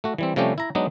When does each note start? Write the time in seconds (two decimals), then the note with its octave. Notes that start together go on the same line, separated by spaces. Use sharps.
0.04 A3 F#4
0.18 E3 G3 C4
0.36 C3 F3 G3 A3 C#4 G4
0.58 E4 A#5
0.75 F#3 G#3 B3 D4 D#4